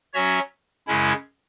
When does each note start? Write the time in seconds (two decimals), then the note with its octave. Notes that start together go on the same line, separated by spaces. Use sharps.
0.14 F#3 C#4 F#4 C#5 E5
0.87 F#2 C#3 G#3 C#4 E4